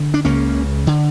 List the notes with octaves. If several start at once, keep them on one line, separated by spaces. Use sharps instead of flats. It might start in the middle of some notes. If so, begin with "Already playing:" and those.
Already playing: D3
D4
C#2 C#3 A#3 C#4
D3